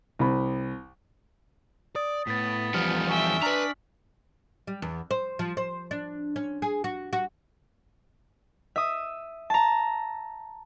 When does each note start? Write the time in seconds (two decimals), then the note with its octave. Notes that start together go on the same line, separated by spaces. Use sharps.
0.19 C2 B5
1.96 D5 D#6 A6
2.27 A2 B3 A6 B6
2.74 E2 F3 G3 F6 C#7
3.09 E5 G5 G#5 C#6
3.43 D4 B4 A#5 F6 B6 F#7
4.67 G3
4.82 E2
5.11 C5
5.39 F3
5.57 C5
5.91 D4
6.36 C#4
6.62 G#4
6.84 F#4
7.13 F#4
8.76 E5 D#6
9.50 A5 A#5